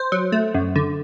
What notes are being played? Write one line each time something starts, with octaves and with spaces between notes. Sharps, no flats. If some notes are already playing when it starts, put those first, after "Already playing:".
Already playing: C5
F#3
A3
F#2
D3